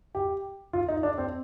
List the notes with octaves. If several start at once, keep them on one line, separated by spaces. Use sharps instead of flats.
G4
F4
D#4
D4
C4